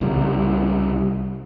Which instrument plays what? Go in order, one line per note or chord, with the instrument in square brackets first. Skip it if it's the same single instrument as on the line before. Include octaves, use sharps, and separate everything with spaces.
[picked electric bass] C2 C#3 G3